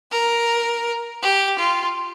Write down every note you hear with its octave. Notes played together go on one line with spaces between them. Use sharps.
A#4
G4
F4